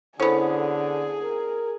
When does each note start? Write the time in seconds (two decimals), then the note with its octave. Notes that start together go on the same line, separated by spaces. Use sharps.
0.20 D3 B3 C#4 E4 G#4 A4 C5
1.23 A#4